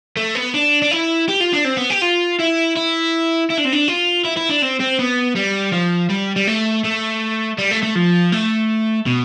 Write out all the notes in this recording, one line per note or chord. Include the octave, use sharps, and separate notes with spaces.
A3
B3
D4
D4
E4
G4
F4
D4
C4
B3
G4
F4
E4
E4
E4
D4
C4
D4
F4
E4
E4
D4
C4
C4
B3
G3
F3
G3
G3
A3
A3
G3
A3
A3
F3
A3
B2